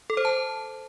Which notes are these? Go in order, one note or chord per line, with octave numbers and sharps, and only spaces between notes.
A4
C5
A5